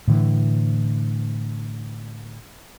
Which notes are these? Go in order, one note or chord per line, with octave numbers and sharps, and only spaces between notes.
A2 D3 E3